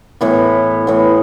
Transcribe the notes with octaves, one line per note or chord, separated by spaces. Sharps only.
A2 E3 B3
A2 E3 B3